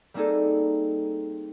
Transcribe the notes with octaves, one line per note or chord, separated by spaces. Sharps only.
G3 A#3 C4 D#4 G#4 A4